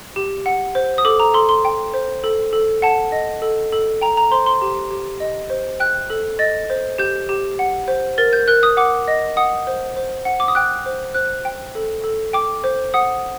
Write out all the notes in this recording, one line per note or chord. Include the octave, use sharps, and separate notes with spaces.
G4
F#5
C5
D#6
A4 D6
A#5
A4 C6
C6
G5
C5
A4
A4
F#5 A5
D#5
A4
A4
G5 A#5
A#5
C5 C6
C6
G4
G4
D#5
C5
G5 F#6
A4
D#5 A6
C5
G4 G6
G4
F#5
C5
A#4 A6
G6
A#4 F#6
D#6
F#5 D6
D#5
F#5 D#6
C5
C5
F#5
D6
D#6
G5 F#6
C5
C5 F#6
G5
A4
A4
G5 D6
C5
F#5 D#6